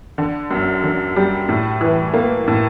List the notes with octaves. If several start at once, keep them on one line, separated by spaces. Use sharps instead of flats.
D3
F#2
D3
G3
A2
E3
A#3
A2